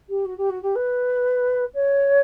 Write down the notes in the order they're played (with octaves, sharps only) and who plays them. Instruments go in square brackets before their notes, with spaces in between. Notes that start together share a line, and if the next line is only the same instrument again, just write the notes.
[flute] G4
F#4
G4
F#4
G4
B4
C#5